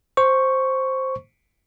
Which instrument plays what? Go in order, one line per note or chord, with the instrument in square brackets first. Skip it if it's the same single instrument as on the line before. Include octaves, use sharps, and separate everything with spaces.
[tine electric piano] C5 C#6